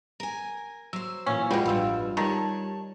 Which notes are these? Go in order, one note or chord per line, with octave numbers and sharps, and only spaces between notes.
A#4 G#5
F#3 C5 E6
A#2 E3 C#4
B2 G3 G#3 F4 B4 C#5 G5
A1 G2 F3 F4 B4 E6
D#3 G3 C#5 A5